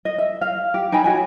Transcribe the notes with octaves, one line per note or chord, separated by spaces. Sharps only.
D#5
E5
F5
G4
D#4 G5 G#5 B5
F#4 C#5 G#5